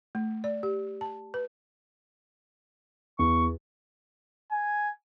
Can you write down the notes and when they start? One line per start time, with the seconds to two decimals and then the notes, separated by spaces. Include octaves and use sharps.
0.15 A3
0.44 D5
0.63 G4
1.01 A5
1.34 B4
3.19 E2 C#6
4.51 G#5